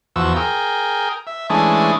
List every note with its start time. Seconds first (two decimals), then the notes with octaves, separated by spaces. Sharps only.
0.16 E2 F3 F#4 E6
0.36 G#4 A#4 G5
1.27 E5
1.50 E3 G#3 A3 C#4 D4 G#4